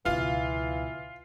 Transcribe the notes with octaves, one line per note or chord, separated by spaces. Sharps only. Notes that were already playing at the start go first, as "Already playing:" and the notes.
C#2 B2 E3 F4 F5